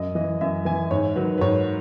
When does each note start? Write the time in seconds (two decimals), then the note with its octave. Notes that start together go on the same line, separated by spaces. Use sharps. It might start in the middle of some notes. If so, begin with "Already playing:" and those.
Already playing: F#2 D#5
0.15 E3 D#5
0.41 F#2 E5
0.65 E3 G#5
0.91 G#2 C#5
1.16 D#3 F#3 B4
1.38 B4
1.41 G#2 C#5